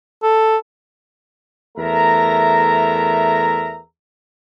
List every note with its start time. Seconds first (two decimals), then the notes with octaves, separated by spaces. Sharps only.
0.23 A4
1.78 E2 A3 A#4 E5 A#5